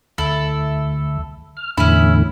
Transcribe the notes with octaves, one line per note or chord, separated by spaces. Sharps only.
D2 E4 A4
F6
E2 A2 D3 C#4 E4